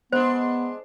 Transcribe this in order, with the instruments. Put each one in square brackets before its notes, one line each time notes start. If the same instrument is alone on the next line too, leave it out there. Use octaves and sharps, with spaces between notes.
[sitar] G#3 D4 [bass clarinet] B3 [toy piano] C5